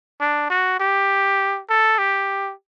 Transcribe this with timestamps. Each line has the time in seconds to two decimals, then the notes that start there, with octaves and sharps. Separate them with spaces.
0.20 D4
0.50 F#4
0.80 G4
1.70 A4
1.99 G4